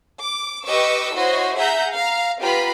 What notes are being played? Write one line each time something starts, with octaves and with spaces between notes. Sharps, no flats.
D6
G4 B4 D#5 C#6 D6 E6
E4 F#4 C5 C#5 D#5
G#4 E5 F#5 A#5 G6
F5 A#5
B3 F4 G4 B4 A#5 B5